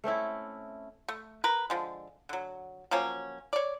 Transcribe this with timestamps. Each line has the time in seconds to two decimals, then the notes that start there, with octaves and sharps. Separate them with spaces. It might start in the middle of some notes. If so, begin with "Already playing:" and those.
0.04 A3 C4 C#4 E4
1.08 A3
1.44 A#4 B4
1.70 D3 F3 G#3
2.29 D3 F#3
2.91 F3 F#3 A#3 C#4
3.53 C#5 D5